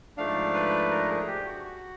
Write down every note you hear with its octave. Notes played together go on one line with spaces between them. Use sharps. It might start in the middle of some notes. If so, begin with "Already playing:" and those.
G#2 F3 A3 D4 F5
B4
A#4
G#4
G4
F#4
F#4